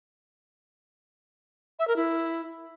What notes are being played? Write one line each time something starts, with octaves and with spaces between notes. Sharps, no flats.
E5
A#4
E4